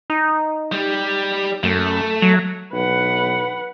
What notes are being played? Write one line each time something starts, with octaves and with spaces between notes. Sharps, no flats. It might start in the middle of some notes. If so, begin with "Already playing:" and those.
D#4
G3
F#2 A3
F#3
B1 B4 F#5